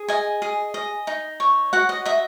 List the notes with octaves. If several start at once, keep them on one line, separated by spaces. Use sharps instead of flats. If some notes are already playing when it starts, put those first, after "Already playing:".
Already playing: G#4
D#5 G#5
G#4
D#5
D#4
C#5
F#4 F#5
D#5
D#5 E5